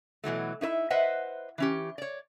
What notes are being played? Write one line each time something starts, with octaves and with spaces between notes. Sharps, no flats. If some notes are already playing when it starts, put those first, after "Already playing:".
B2 E3 F#3 A3
D#4 E4 B4 E5
B4 C5 D#5 E5 F#5
E3 C#4 G4
C#5 D5